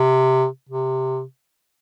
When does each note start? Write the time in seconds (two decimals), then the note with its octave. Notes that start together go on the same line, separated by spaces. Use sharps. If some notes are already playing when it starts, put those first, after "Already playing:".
Already playing: C3
0.69 C3